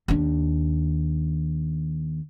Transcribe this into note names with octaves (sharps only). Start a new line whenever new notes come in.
D#2 D4